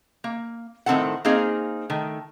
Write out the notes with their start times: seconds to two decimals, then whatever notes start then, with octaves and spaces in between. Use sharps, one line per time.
0.24 A#3
0.86 A2 D#3 C4 F4 A4 F#5
1.25 A#3 C4 D#4 G#4 F5
1.90 D#3 A3